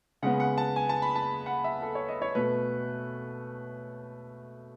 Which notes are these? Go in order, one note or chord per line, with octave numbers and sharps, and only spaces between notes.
C#3 G#3 B3 F#5
F#5
A5
G#5
A5
B5
A5
F#5
E5
A4
C#5
D#5
C#5
B2 A3 B4